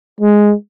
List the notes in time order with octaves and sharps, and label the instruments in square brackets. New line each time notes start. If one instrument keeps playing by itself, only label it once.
[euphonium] G#3